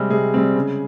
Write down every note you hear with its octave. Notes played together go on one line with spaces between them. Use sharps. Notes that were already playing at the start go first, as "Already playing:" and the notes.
Already playing: C3 G3 G#3 C4 G#4
C3 G#3 G#4
G3 C4
C#3